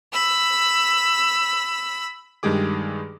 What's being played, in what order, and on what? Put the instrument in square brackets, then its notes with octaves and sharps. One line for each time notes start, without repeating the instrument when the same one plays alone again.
[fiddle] B5 E6
[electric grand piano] G2 D#3 G#3 G4 G#4 D6